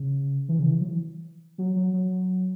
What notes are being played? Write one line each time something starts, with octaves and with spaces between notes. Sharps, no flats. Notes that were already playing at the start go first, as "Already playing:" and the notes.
Already playing: C#3
E3
C#3
E3
F#3
E3
F#3
F#3
F#3